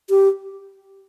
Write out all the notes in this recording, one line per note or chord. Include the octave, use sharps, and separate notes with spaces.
G4